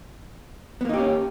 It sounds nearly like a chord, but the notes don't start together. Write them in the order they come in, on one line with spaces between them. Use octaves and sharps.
B3 A#3 D#4 G4 C#4